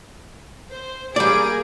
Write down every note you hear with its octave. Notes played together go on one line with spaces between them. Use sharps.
C5
G3 A#3 G#4 D5 D7